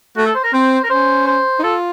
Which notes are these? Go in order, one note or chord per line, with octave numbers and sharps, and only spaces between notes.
A3 F#4
A4
C5
A#4
C4 C5
A#4
C#4 C5
C5
D#4
F4 A4